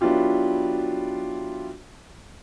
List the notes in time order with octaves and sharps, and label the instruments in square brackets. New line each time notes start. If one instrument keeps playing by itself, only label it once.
[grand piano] F#3 B3 D4 E4 F4 G4